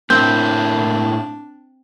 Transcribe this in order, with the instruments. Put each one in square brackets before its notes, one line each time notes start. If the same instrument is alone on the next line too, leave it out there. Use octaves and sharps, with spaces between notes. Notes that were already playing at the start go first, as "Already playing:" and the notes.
[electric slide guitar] A2 A#3 E4 [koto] C4 [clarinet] D4 [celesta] G6